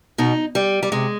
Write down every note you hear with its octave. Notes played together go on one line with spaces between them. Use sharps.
B2 D#4
G3
G3
C3 G#3